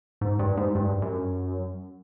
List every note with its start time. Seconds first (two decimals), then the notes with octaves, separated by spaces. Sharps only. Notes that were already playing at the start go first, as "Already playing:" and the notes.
0.21 G#2
0.39 G2
0.57 G#2
0.75 G2
1.02 F#2